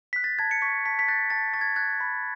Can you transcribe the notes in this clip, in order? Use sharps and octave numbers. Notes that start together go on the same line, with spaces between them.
F#6 B6
A6
A5 G#6
C#7
C#6 B6
A5 B6
B6
F#6 A6
A5 A6
C#6 A6
G#6
F#6 G#6
B5